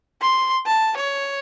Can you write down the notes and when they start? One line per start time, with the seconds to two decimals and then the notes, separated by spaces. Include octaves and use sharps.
0.21 C6
0.66 A5
0.97 C#5